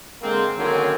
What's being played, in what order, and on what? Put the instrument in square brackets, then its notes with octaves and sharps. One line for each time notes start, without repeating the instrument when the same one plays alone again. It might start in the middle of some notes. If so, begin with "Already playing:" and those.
[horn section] D3 G#3 A#3 C4
D3 D#3 F#3 A#3 C4 C#4